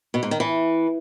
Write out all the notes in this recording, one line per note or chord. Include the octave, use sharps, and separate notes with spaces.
B2
G#2
D#3
E3